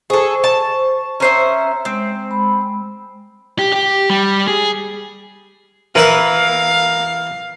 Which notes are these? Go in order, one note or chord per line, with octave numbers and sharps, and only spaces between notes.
G#4 A4 C5 C#6
A5
C#4 C5 E5 A#5
G#3 C4
G#3 B5
G4
G4
G3
G#4
E3 A#4 B4 E5 F5